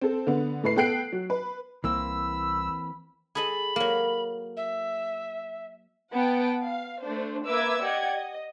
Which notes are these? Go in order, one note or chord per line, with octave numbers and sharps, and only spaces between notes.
C4 A4
D3 B3
A2 A3 B4 C7
B3 A4 G5 F#6 C7 D7
F#3
B4
C2 E3 A#3 C4 B5 E6
G#4 A4 D#5 B5
F#3 A#3
E5
B3 F#5 G5 A5 D7
F5
A3 D4 C5
A#3 B4 E5 D6 E6 G#6
G4 D5 D#5 F#5 G#6
D#5